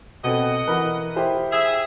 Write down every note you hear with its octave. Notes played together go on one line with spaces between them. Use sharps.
B2 C4 A4 D#5 F#5
E3 A#4 B4
E4 G4 C5
G#4 E5